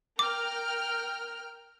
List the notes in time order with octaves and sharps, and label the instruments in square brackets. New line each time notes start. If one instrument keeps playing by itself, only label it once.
[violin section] A#4 G5 F6 [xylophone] D6